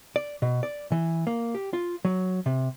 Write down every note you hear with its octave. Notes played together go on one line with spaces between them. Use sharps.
D5
B2
D5
E3
A#3
G4
F4
F#3
C3